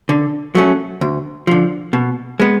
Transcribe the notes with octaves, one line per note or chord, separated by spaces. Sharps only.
D3
F#3 A3 C#4
D2
D3 F3
B2
G#3 B3